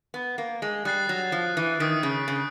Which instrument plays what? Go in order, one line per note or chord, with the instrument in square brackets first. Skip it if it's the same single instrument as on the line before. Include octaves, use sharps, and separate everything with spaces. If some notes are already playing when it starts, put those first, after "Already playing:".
[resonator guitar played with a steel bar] B3
A#3
G#3
[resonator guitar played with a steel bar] G3 [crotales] D#6 F#6 A6 C7
[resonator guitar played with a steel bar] F#3
F3
E3
[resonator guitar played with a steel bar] D#3 [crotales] D#6 G6 B6 D7
[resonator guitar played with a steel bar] C#3
C#3